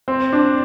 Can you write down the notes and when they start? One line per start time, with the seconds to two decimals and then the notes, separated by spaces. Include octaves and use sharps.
0.08 C4
0.33 D4